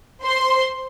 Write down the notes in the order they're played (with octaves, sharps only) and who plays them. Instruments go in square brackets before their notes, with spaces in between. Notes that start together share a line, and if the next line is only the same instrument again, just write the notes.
[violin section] C5 C6